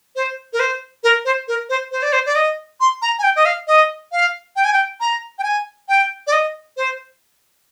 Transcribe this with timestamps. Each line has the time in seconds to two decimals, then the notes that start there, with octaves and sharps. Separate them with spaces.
0.16 C5
0.53 A#4
0.60 C5
1.04 A#4
1.25 C5
1.48 A#4
1.69 C5
1.92 C5
2.02 D5
2.13 C5
2.26 D5
2.36 D#5
2.80 C6
3.02 A#5
3.19 G#5
3.23 G5
3.36 D#5
3.45 F5
3.67 D#5
4.12 F5
4.56 G5
4.65 G#5
4.73 G5
5.00 A#5
5.39 G5
5.44 G#5
5.89 G5
6.27 D5
6.33 D#5
6.77 C5